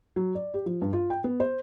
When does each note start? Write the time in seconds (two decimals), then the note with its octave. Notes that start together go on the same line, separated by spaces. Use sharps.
0.16 F#3
0.35 D5
0.54 G4
0.66 F3
0.82 G2
0.93 F4
1.10 G5
1.24 B3
1.40 C5